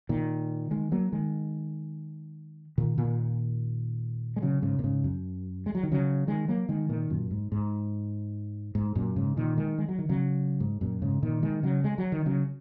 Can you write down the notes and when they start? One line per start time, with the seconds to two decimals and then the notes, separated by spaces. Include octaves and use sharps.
0.09 A#2 D#3
0.71 D#3 G#3
0.92 F#3 A#3
1.12 D#3 G#3
2.78 A#2 D#3
2.98 A#2 D#3
4.36 G#3
4.42 C#3 F#3
4.62 G#2 C#3
4.79 A#2
4.84 G#2 C#3
5.04 F#2
5.66 G#3
5.75 F#3
5.83 D#3
5.92 C#3 F#3
6.27 D#3 G#3
6.48 F#3 A#3
6.69 D#3 G#3
6.89 A#2 D#3
7.10 F#2 A#2
7.31 G#2
7.52 G#2
8.75 G#2
8.95 F#2 A#2
9.16 G#2 C#3
9.37 A#2 D#3
9.58 D#3 G#3
9.78 G#3
9.89 F#3
9.98 D#3
10.09 C#3 F#3
10.60 G#2
10.81 F#2 A#2
11.02 G#2 C#3
11.23 A#2 D#3
11.43 D#3 G#3
11.63 C#3 F#3
11.84 G#3
11.98 F#3
12.12 D#3
12.26 C#3 F#3